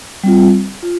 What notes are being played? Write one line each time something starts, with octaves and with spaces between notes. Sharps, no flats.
G3 C4 F4
F4